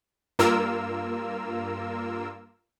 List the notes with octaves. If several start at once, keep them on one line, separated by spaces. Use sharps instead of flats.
G2 A#3 F4 A#4 E6